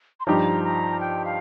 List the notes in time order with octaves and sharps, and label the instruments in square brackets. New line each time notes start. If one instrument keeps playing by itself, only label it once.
[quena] C6
[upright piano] G2 F3 D#4 G4 [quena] A#5
[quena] A#5
G5
F5